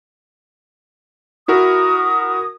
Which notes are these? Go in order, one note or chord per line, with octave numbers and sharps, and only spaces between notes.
E4 F#4 A#4 D#6